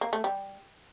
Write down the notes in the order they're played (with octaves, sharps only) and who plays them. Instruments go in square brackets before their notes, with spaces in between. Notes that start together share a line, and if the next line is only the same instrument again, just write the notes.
[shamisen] A#3
A3
G3